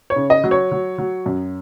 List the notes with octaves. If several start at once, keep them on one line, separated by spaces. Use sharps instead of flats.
C#5
C#3
D#5
F#3
C#5
F#3
F#3
F#2